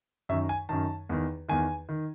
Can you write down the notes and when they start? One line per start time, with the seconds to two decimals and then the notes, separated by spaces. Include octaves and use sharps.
0.29 F#2 D#3 E5
0.49 G#5
0.69 F#2 D#3 A5
1.09 E2 D#3
1.49 E2 D#3 G#5
1.89 D#3